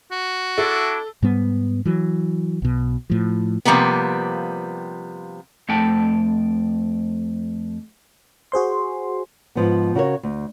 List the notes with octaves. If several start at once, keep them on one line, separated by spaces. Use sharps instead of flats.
F#4
D4 E4 A4
G#2 G3 B3
E3 F#3
B1 B2
A2 F3
C3 F3 G3 A#3 B3
F2 A3 G5 A5
F#4 G#4 C5 C6
G#2 F3 B3
C#3 F#4 A#4 C#5
D2